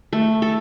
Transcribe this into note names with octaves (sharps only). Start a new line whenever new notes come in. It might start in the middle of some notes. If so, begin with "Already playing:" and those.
A3
A4